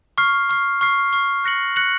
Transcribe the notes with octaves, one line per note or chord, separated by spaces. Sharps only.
C#6 F6 C7
C#6 F6 C7
C#6 F6 C7
C#6 F6 C7
F#6 A#6 C#7 F#7
F#6 A#6 C#7 F#7